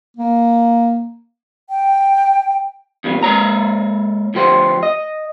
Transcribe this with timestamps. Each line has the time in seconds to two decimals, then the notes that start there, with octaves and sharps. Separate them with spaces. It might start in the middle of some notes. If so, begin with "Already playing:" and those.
0.17 A#3
1.70 G5
3.04 E2 A#2 G3
3.23 G#3 A#3 C#5 A#5
4.34 D2 F3 G4 C5
4.83 D#5